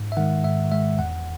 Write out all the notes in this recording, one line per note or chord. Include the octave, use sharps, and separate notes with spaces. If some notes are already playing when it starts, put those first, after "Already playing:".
Already playing: G#2
E5
D#3 G#3 F#5
G#2 E5
D#3 G#3 E5
E2 F#5